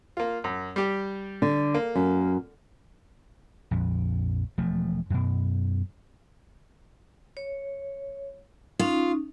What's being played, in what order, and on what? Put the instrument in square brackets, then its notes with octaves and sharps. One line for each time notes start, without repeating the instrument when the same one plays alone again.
[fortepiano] A#3 F4
F#2
G3 G4
[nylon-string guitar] D3
[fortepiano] A#3
[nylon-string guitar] F#2
[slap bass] A#1 F2
E1 F3 A3
F#2 B2
[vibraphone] C#5
[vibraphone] C#4 D#4 [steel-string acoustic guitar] F4